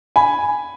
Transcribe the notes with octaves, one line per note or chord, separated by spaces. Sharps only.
G#5 B5